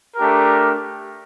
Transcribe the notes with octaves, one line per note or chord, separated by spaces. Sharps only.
A3 D4 G4 A#4